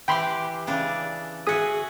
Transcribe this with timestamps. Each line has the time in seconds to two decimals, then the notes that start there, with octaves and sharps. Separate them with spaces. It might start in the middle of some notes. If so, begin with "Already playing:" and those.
0.08 E3 G4 G5 B5 C6
0.67 C#3 E3 D4
1.47 F#4 G#4 E5 D#6